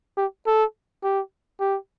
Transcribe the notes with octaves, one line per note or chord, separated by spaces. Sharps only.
G4
A4
G4
G4